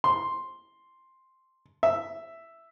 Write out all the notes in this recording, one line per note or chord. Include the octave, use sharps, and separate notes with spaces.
C6
E5